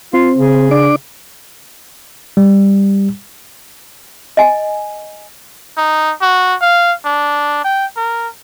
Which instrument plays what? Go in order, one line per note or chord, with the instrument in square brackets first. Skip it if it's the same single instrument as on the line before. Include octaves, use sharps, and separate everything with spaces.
[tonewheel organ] C4 [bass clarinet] F4
[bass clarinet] C#3
[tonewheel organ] D4 D5 D6
[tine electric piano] G3
[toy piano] D#5 G#5
[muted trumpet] D#4
F#4
F5
D4
G5
A#4